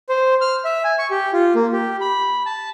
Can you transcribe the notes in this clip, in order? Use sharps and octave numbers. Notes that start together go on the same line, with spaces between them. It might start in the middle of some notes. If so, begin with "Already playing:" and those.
C5
F6
E5
G#5
C#6
G4
F4
A#3
G4
B5
A5